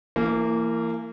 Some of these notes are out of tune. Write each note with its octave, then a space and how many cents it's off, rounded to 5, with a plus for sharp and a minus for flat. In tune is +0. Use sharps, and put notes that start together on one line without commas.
E3 +25 A#3 -25